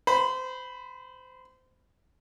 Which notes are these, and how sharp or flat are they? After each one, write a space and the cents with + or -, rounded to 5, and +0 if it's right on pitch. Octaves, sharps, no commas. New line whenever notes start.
C5 -25 B5 +0